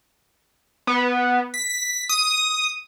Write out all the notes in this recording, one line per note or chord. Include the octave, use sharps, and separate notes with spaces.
B3
B6
D#6